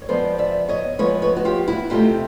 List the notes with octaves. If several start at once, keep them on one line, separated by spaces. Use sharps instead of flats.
C#5
F3 G#3 B3 C5 D5
D5 E5
C#5 D#5
F3 G#3 B3 B4 C#5
B4 C#5
F#4
F4 G4
E4 F#4
C3 F3 A3 C4 D#4 F4 G4